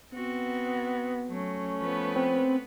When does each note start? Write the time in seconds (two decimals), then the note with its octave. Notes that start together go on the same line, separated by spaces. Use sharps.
0.13 B3 C4 F#4
1.29 F#3 A3 C#4
1.82 F3 B3 B4
2.16 C4